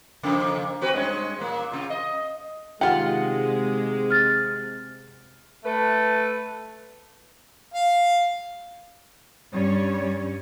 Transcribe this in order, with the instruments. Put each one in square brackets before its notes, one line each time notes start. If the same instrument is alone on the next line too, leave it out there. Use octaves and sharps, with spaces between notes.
[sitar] F2 C#3 A#3
C4 F#4 B4
G2 G#3 C#4
A#2 A#3
C3 F4
D#5
[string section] C3 G#3 [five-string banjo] D#3 F4 G4 [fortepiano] F#5
[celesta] F6 A6
[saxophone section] A3 B4
[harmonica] F5
[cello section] G2 G3 C#4 C#5